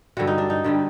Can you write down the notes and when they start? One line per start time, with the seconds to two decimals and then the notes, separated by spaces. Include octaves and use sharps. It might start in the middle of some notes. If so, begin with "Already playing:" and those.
0.17 G2 D3 G3 F#4
0.27 D#4
0.38 D4
0.50 D#4
0.64 G2 D3 G3